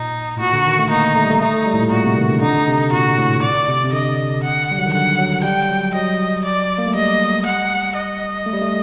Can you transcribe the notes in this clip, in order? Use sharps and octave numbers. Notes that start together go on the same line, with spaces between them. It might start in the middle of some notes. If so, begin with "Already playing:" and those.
Already playing: A#2 D#4
A2
A#2 F#4
D3
D#3
A3
A#3 D#4
A3
G3
A3
A3 D#4
A3
G3
A2
A#2
A#2 F#4
C3
D#3
D3
D3 D#4
C3
A#2 F#4
A2
D5
C3
C3
D3 D#5
F#5
G3
F#3
D#3
D3 F#5
F#3
G3 G5
F#3
F#3 D#5
D5
A#3
A3
G3 D#5
F#5
D#5
A3
G3
A3